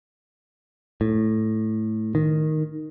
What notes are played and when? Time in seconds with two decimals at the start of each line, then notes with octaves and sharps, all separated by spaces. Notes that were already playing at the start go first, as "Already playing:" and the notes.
1.01 A2
2.15 D#3